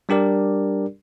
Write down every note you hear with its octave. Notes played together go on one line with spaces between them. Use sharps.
G3 D4 G4 A#4 D5